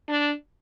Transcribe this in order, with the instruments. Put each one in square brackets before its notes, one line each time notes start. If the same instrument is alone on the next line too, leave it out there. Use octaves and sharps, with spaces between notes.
[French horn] D4